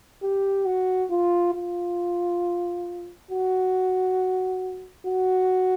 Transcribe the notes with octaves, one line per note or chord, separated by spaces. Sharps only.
G4
F#4
F4
F4
F#4
F#4